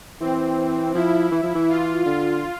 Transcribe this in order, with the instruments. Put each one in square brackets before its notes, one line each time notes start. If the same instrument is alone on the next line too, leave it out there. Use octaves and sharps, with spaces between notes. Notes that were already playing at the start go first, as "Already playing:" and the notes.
[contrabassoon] E3 [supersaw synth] C4
[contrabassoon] F3 [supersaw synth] E4
[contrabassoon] E3
F3
E3
[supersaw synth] F4
[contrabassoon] D3 [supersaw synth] F4